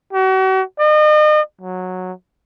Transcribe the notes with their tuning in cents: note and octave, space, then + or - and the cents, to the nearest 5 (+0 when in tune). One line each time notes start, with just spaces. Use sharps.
F#4 +40
D#5 -35
F#3 -10